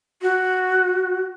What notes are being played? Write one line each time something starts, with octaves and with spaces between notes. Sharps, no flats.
F#4